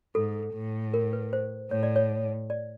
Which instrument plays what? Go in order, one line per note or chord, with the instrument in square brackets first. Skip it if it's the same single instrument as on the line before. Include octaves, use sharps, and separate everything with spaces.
[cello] G#2 [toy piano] A4
[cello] A2
[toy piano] A#4
B4
C5
[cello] A2 [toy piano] C#5
[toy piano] D5
C#5
D5